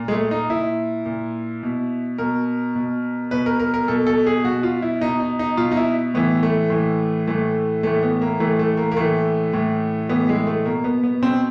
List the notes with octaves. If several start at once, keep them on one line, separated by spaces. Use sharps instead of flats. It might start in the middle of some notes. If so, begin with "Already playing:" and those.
Already playing: A#2
G#3
A3
D#4
A#2 E4
A#2
B2
B2 A#4
B2
B2 B4
A#4
A#4
A#4
B2 A4
A4
G#4
B2 F#4
F4
E4
B2 D#4
D#4
D#4
B2 F4
D#4
E4
A2 E3 B3
A3
A2 E3
A2 E3 A3
A2 E3 A3
B3
A#3
A2 E3 A3
A3
A#3
A#3
A2 E3 A3
A2 E3
A2 E3 B3
G#3
A3
B2 A#3
B3
B3
B2 C4